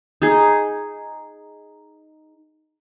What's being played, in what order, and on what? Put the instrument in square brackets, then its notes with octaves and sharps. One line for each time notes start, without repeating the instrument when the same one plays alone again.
[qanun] D#4 G#4